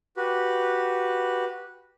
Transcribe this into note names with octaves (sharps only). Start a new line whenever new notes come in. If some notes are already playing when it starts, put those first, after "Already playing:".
F#4 G4 B4